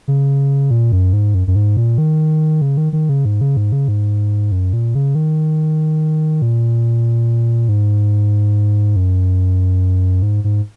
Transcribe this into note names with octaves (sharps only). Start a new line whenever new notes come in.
C#3
A#2
F#2
G#2
F#2
F#2
G#2
A#2
D#3
C#3
D#3
D#3
C#3
G#2
C#3
G#2
C#3
G#2
F#2
A#2
C#3
D#3
A#2
G#2
F#2
G#2
G#2